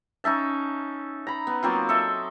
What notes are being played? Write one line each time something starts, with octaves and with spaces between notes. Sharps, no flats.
C#4 D#4 E5 A5
A#5 B5
B3
F#3 A#3 C4 F4
A4 D#5 E5